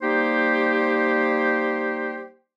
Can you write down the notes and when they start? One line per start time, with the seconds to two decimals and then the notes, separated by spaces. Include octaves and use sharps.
0.01 G3 A#3 D#4 G4 C5